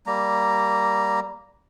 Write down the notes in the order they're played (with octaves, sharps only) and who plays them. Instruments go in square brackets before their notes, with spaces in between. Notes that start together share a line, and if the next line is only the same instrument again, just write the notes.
[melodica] G3 A#3 A#5